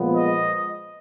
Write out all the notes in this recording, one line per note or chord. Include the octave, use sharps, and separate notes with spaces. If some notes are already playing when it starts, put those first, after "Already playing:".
Already playing: A#2 F3 G#3 B3
D#5